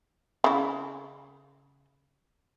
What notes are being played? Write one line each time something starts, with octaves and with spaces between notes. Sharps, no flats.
C#3 E4